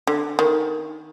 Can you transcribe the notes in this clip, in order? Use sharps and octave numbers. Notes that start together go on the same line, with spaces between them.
D3
D#3